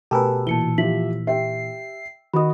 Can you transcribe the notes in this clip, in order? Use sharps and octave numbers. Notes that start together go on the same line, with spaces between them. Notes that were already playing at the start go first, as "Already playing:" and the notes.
B2 A3 G4 A#4 B4 G#5 A5 E6
A#2 E3 A5 C#7 G7
F3 E4 G4 E5 B6 F#7
G4 E5 G5 C7
D#3 F#4 D#5 B5 D#6